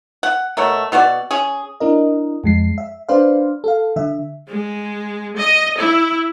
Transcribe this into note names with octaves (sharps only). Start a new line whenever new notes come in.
F#5
B2 A3 A#4 C#5
B2 B3 F#4 D5
C#4 G#4
D4 E4 A#4 D#5
F2 G#3 C7
E5
D4 B4 C5 D5 F5
A4 F5
D3 E5
G#3
D#5
E4